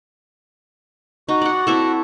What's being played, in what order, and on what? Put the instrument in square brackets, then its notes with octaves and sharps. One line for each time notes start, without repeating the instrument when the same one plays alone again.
[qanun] D#4 [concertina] F#4
[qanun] D5 F#5
C4 E4 A4